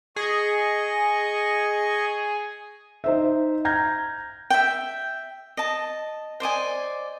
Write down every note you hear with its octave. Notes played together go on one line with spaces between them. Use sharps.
G#4 D#5 C#6
D#4 C5 E5
A#5 F6 G6 G#6 A#6
E5 G5
D#5 A5
C5 D5 D#5 G#5